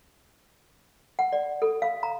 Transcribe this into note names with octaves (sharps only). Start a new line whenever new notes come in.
F#5
D5
A4
F5
A#5